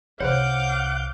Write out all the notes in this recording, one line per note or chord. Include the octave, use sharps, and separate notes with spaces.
C2 C5 C#5 F5 F#5 D6 G6